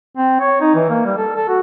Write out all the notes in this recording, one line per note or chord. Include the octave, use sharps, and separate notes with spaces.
C4
C#5
D#4
E3
A#3
G3
A4
A4
F#4